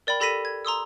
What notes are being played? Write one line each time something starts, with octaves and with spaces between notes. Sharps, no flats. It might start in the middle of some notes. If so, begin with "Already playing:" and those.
A#4 D5 G5 B5
G4 A4 B5 A#6 B6 D#7
G#6
A#5 C6 D#6 E6